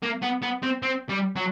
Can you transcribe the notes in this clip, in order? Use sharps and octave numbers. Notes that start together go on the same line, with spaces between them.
A#3
B3
B3
C4
C4
G3
F#3